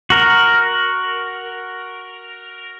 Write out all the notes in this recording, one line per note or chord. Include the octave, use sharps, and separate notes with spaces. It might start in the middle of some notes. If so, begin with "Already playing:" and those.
F#4 A#4